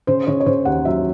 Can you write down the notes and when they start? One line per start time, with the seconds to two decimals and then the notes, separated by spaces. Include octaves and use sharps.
0.07 C#3 C5
0.27 C#3 C#5
0.40 C#5
0.46 C#3 C5
0.65 D#2 F#5
0.85 F#3 E5